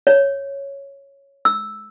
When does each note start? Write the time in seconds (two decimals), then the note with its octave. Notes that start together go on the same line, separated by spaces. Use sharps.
0.07 C#5
1.45 E6